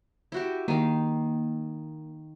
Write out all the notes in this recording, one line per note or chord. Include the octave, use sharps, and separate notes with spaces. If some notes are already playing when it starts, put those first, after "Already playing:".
E4 F#4 G4
D#3 A#3 F5